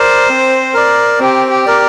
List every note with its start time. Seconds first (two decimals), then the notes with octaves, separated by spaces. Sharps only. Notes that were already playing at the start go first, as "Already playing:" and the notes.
Already playing: A#4 C5 D5
0.29 C4
0.74 A#4 D5
1.20 C4 G4
1.50 G4
1.66 A#4 D5